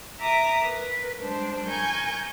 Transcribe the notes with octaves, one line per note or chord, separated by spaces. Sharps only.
E5 A#5 D6 D#6
A#4 B4
G3 G#3 D4 C5
A#4 G#5 C#6 G6